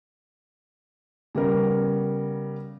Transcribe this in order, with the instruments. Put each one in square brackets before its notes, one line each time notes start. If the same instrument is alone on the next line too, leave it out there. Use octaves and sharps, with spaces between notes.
[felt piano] C#3 G3 B3 A#4